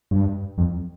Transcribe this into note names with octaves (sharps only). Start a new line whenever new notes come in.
G2
F2